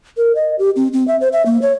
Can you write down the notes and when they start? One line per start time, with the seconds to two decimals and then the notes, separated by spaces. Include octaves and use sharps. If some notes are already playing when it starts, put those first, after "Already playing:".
0.17 A#4
0.35 D#5
0.59 G4
0.76 C4
0.93 C4
1.08 E5
1.21 C5
1.33 E5
1.46 A#3
1.62 C#5